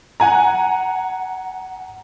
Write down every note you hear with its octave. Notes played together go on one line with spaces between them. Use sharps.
F#5 G#5 A#5